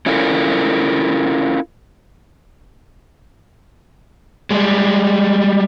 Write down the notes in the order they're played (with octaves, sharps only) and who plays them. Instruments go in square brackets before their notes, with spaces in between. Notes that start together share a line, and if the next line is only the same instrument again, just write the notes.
[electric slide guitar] C#4 E4 F4 A4 A#4
[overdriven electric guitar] G3 G#3